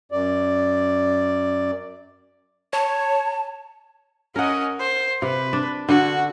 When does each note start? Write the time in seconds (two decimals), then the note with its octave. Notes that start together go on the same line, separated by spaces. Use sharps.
0.12 F#2 D5
2.73 C#5 A5
4.36 C#4 A#4 D#5 F#5
4.80 C5
5.22 C3 B4
5.53 D4
5.89 D3 F#4